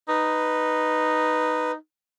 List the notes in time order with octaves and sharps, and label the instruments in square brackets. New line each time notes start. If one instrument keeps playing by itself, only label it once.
[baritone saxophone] D#4 [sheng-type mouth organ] B4